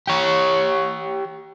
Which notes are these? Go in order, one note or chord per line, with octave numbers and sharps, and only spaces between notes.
G4 C#5